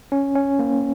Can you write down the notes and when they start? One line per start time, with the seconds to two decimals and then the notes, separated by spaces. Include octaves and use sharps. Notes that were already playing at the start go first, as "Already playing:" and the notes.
0.12 C#4
0.35 C#4
0.59 A#3